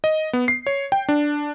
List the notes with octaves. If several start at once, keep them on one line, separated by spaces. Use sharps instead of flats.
D#5
B3
C7
C#5
G5
D4